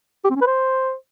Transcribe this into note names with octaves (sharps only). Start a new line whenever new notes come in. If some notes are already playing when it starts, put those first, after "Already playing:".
G4
C4
C#4
B4
C5